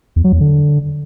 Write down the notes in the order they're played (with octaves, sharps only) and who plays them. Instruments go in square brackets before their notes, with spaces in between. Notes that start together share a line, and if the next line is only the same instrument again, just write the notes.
[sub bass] E2
F#3
E2
D3